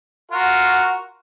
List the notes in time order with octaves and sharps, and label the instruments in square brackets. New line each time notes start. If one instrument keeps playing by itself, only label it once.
[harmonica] F4 F#4 A#4